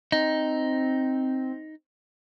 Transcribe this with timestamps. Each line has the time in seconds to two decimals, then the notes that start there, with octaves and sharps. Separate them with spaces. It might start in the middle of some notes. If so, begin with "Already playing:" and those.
0.12 C4 D#4